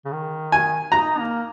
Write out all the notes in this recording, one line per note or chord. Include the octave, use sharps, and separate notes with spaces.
C#3
D#3
G#5
D#4 A#5
A#3